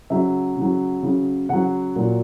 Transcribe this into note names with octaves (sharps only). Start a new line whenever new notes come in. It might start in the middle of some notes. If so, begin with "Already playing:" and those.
C#3 F#3 E5
C#3 F#3
C#3 F#3
C#3 F#3 F#5
A#2 F#3